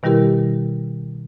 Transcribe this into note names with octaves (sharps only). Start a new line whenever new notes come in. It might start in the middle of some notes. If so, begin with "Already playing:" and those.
B2 D#3 G3 E4 G4 A#4